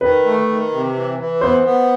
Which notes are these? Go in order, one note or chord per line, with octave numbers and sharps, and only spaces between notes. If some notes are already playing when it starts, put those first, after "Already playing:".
D#3 B4
A3
D#3
C3
E3
E3
B3 C5
B3